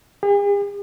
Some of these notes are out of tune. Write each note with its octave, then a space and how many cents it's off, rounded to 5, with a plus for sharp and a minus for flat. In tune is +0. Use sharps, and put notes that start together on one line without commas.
G#4 -45